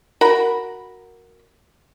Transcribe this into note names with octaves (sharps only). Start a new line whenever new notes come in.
F#4 A#4 B5